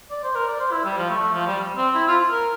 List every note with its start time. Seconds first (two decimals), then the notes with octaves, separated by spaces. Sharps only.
0.11 D5
0.24 C5
0.35 A#4
0.47 D5
0.60 C5
0.72 E4
0.85 G3
0.98 F3
1.10 A3
1.21 A3
1.34 F3
1.46 G3
1.77 C4
1.95 E4
2.08 F4
2.32 A#4